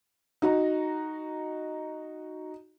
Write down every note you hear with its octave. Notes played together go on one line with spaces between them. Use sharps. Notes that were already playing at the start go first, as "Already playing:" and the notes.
D#4 F#4 A#5